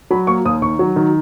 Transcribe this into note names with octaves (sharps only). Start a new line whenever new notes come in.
F#3 B5
A#3 C#6
D#2 D#6
D#3 C#6
F#3
D#3